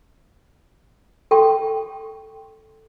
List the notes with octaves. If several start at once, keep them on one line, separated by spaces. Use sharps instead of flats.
A4 G5 C6 C#6